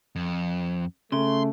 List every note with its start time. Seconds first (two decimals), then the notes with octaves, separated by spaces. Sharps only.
0.16 F2
1.12 C#3 A3 C6